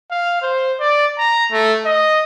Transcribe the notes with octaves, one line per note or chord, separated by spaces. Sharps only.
F5
C5
D5
A#5
A3
D#5